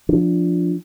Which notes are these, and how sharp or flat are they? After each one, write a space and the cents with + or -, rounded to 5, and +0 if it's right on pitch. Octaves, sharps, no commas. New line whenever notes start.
F3 +0 D4 +0